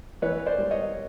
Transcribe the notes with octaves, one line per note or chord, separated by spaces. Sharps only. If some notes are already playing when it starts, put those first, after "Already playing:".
E3 B4 C#5
C5 D5
G3
C#5 D#5